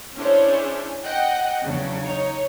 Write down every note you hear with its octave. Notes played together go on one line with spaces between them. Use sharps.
C#4 D4 E4 G#4 C5 C#5
D#5 F#5 G5
E2 C#3 F#3 D4
D#4 C#5